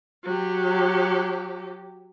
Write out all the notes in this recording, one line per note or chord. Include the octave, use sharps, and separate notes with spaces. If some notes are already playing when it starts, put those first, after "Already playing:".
F#3 G4